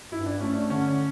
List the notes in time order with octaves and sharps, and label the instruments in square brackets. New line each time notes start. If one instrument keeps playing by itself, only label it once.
[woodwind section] G2 [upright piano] E4
[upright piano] D4
[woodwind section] A3 [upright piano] C#4
[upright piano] D4
[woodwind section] D3 [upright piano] C#4